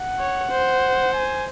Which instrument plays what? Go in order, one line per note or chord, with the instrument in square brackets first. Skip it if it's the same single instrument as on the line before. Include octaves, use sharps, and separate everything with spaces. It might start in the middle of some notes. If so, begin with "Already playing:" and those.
Already playing: [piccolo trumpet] F#5
[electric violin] C#5
C5
[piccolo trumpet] G#5